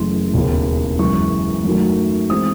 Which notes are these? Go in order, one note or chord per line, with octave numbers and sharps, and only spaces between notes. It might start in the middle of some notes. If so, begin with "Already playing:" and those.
Already playing: F#1 F#2 E3 A3 C6
E1 D#2 C#3 E3
F#2 C#3 E3 G#3 C#6
F#2 D#3 F#3 A3
E3 G#3 C4 D#6